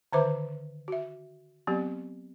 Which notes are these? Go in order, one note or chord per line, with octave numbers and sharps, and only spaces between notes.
D3 D#3 B4 C5 E5 D6
F#4 E5
F#3 B3 C4 G4